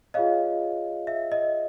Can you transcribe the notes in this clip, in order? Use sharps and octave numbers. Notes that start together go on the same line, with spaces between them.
F4 G#4 C#5 D#5 F5
E5
D#5